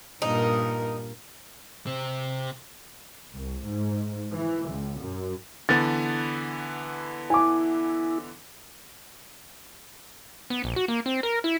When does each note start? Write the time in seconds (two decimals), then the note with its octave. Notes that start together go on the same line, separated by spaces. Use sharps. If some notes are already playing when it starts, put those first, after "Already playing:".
0.22 G2 A#2 D#4 A#4
1.87 C3 C4
3.34 C2
3.64 G#2
4.33 E3
4.69 C#2
5.00 F#2
5.69 D3 E3 B3 A6
7.30 E4 G#5 D6
10.50 B3
10.64 A#1
10.76 F#4
10.88 A#3
11.06 C4
11.23 A#4
11.44 E4